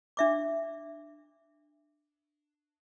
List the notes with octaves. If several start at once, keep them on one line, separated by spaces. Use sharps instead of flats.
D4 E5 D6